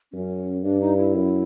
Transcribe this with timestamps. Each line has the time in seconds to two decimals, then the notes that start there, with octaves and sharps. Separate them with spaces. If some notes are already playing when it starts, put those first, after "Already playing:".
0.12 F#2 C#4
0.63 G2 D4
0.81 D#4
0.97 E4
1.15 F#2